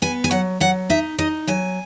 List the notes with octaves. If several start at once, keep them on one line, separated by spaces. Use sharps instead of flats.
B3 G#5
G#5
F#3 F#5
F#3 F#5
D#4 E5
D#4 D#5
F#3 G#5